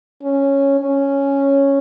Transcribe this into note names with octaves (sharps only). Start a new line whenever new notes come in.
C#4
C#4